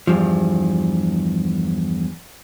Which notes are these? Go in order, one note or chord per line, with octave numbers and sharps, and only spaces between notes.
E2 G2 F3